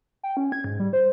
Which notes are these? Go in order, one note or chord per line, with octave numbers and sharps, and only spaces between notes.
G5
C#4
G#6
G#2
G3
C5